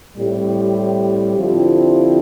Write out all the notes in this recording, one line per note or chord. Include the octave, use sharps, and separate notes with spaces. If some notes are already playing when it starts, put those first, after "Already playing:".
A2 G3 C4 G4
D3 F3 C4 E4 G4